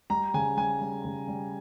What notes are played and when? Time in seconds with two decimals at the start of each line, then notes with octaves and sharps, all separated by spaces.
0.10 G3 A#5
0.34 C#3 G#5
0.57 G3 G#5
0.81 G3
1.05 C#3
1.28 G3